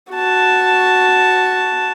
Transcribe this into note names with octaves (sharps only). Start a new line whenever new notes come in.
F#4 A5